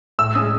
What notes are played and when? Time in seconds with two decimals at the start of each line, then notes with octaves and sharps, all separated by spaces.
0.19 A2 E6
0.35 G#3 C#4 D#6